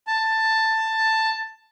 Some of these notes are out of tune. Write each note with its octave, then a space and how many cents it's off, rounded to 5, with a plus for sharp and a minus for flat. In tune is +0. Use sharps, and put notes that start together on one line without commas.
A5 +10